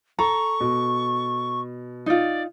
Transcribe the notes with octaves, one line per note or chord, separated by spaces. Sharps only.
A4 A#5 C#6
B2
D#4 F4 D5